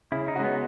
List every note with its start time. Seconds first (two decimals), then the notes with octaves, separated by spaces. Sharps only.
0.12 C#3 E4
0.28 D#4
0.36 G#3 C#4 F#4
0.44 B3